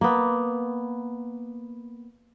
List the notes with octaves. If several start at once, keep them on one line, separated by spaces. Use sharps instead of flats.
A#3 B3